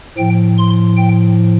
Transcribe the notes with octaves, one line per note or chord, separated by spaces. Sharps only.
A2 F3 G5
C6
G5